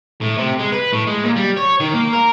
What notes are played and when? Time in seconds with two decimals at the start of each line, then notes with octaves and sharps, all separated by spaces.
0.21 A2
0.38 C3
0.59 G#3
0.72 B4
0.93 A2
1.07 G#3
1.24 A#2
1.36 G3
1.57 C#5
1.80 D#3
1.94 A#3
2.13 A#4